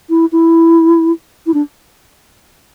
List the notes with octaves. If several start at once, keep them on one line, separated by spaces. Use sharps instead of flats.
E4
E4
E4
D4